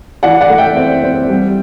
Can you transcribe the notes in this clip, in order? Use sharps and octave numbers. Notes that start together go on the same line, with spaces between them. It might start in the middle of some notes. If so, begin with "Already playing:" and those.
E3 D5 F#5
D5 F#5
A3
E5 G5
C4
C4
G3